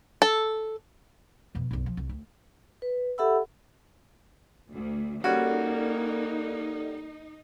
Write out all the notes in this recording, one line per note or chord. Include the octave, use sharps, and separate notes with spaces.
A4
F2 B2
B1 F#2
F3
C2
D2
B4
G4 A4 E5 F#5 B5 E6
D2
G3 A#3 C#4 D#4 F#4 A4 D5